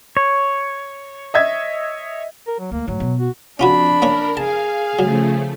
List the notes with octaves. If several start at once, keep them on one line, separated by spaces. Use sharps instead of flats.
C#5
D#5 E5 G#6
A#4
F#3
D2 A#3
D2 G#2 F#3
B2
F#4
F2 C#4 D4 F4 F#4 B5
A#3 C#4 A#4 C#5
G#4 F5 A5
C#3 F3 F#3 A3